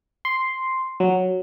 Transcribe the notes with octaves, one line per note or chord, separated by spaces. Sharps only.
C6
F#3